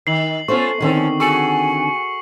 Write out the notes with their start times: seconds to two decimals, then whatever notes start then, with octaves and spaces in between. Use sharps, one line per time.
0.07 D#3 C7 F#7
0.48 A3 B3 C#4 F4 A4 C5 C#6
0.81 D#2 D3 D#3 C4 C#4 A4
1.20 F#4 G#4 A4 G#5 C#6 C#7 F#7